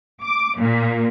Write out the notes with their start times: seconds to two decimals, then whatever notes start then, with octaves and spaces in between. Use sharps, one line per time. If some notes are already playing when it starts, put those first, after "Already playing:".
0.24 D6
0.59 A#2